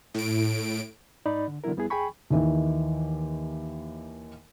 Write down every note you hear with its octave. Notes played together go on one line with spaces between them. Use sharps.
A2 D7
G#2 D#4 D5 B5
D3
D3 D#3 F#3 B3 E4 A#4
F2 G3 B3 E4 G#4
D#2 G#4 G5 G#5 B5 C#6
D#2 D#3 E3